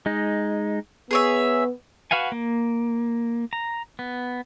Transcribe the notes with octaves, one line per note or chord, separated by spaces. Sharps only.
G#3 D#4
B3 G#4 C#5 E5
F#4 B4 F5 F#5 G#5
A#3
A#5
B3